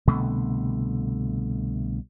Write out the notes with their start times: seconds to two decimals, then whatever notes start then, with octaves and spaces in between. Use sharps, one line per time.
0.08 C2 B2 D3 A3